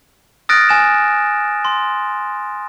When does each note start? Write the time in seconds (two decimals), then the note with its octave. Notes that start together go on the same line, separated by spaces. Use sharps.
0.49 D#6 F6 F#6 A6 A#6 D7
0.69 G#5 E7
1.65 C6